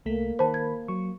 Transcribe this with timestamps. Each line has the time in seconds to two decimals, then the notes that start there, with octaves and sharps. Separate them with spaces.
0.06 C2 A3 A#3 B6
0.39 D#3 C5 A5 B5
0.54 G#6
0.88 F#3 C#6